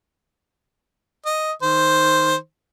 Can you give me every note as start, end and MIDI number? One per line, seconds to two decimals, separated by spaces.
1.25 1.52 75
1.62 2.35 51
1.62 2.35 72